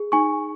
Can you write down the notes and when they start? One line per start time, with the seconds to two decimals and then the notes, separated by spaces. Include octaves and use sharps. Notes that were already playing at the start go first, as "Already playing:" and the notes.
Already playing: G#4
0.12 D#4 G#5 C#6